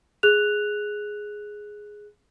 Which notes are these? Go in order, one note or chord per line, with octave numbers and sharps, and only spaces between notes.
G#4 F#6 F7